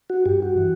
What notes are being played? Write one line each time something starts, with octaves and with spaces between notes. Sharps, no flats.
F#4
G2 G4
F#4
E3